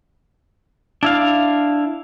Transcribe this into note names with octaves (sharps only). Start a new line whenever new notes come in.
D4 E4 F5